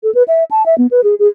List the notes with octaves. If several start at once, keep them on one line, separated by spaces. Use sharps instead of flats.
A4
B4
E5
A5
E5
B3
B4
G#4
G#4